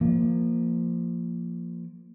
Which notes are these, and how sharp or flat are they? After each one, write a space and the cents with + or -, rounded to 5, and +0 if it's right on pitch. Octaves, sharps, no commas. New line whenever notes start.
F3 -10 A#3 -5